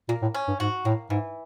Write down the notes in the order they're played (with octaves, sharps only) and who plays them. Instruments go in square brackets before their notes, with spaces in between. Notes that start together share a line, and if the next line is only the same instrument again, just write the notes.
[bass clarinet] A#2 [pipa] A#3
[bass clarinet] A2
[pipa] C#4
[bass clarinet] G2
[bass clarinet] G#2 [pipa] F#4
[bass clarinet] A2 [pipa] A#3
[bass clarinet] G#2 [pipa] E3